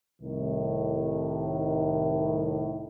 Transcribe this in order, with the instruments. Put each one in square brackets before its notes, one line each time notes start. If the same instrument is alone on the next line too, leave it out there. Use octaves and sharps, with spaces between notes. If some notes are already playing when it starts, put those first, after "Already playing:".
[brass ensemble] C2 A2 D#3